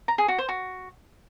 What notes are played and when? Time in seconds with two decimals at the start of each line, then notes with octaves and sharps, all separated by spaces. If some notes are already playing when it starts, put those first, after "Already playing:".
0.08 A#5
0.18 G#4
0.28 F#4
0.38 C5
0.49 F#4